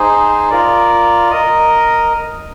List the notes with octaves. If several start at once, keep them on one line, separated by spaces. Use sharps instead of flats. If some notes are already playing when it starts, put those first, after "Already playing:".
Already playing: D#4 G#4 C5
F4 A#4 D5
A#4 D#5